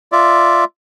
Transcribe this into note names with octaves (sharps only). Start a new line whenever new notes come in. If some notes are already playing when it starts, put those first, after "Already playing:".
F4 D5 E5